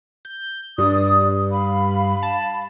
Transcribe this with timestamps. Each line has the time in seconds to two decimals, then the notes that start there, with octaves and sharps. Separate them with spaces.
0.25 G6
0.78 G2 D5 D#6
1.52 F5 B5
2.23 A5